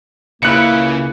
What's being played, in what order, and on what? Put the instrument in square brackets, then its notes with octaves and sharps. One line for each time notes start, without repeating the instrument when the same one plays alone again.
[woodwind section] C#2 A#3 [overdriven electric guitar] C#3 [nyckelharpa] E4 A#4 [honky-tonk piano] F#6 C#7